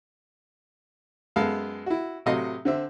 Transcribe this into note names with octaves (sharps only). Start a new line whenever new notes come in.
F#2 G#3 B3 A4 F5
E4 F#4
A2 C3 F#3 D#5 F5 D#6
D3 C4 E5